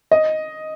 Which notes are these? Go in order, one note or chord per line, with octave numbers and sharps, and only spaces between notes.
D#5